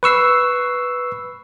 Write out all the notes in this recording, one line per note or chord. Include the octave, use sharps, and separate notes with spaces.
B4 C#6 E6 C7